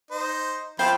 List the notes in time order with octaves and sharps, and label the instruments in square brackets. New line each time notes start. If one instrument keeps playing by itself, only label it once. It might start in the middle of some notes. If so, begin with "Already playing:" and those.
[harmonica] D#4 C5
[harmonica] F3 B5 [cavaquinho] C5 E5 G5